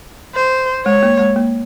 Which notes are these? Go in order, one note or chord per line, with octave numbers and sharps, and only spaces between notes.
C5
G#3 C#5
A#3
G#3
A#3